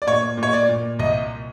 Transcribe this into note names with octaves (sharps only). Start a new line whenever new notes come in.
D5
A#2 C#5
A#2
C#5
D5
A#2
C2 D#5